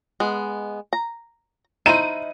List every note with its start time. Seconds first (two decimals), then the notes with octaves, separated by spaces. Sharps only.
0.20 G#3 B3
0.93 A#5
1.86 D#4 E4 C5 D#7